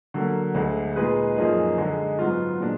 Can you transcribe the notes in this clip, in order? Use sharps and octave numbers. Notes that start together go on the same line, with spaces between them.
D3 F#3 A#3
D2 D3 G#3
A#2 G#3 D#4 G#4 B4
F#2 F3 A#3 D#4 G#4
D3 G#3 D#4
G#2 F#3 B3 F4
A#2 G#3 D4